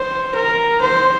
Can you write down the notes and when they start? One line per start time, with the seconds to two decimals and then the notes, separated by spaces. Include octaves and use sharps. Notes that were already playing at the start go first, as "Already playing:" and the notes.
Already playing: C5
0.35 A#4
0.82 C5